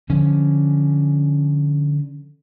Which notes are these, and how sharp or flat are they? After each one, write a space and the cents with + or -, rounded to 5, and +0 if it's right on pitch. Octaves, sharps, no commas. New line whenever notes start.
D3 +0 F3 +0 C#4 +0